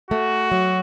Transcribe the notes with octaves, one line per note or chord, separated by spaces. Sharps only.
A3 F#4
F#3